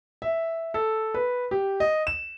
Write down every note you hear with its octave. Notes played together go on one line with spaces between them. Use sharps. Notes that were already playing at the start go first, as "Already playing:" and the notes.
E5
A4
B4
G4
D#5
E7